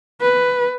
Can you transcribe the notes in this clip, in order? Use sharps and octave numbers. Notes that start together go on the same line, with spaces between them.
B4